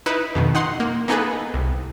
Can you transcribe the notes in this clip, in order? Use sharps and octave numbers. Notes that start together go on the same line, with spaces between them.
D#4 E4 B4
F2 B2 D#3
D#4 F#5 C6
A#3
A#3 B3 D#4 G#4 A4 B4
C2